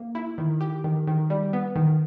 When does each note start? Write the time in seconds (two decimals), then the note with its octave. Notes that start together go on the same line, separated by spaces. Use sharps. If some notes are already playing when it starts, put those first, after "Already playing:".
Already playing: A#3
0.15 E4
0.38 D#3
0.61 G4
0.84 D#3
1.07 D#3
1.30 G3
1.53 B3
1.76 D#3